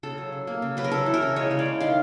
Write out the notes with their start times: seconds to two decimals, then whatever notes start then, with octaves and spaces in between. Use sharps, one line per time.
0.03 C#3 A4
0.18 F#3
0.32 C#3
0.47 A#3
0.62 C#3
0.77 F#3 B4
0.84 A#4
0.91 C#3 A4
1.06 E3
1.14 A#4
1.22 C#3
1.36 G#3 C#5
1.51 C#3
1.59 D5
1.66 E3
1.81 D#3 F5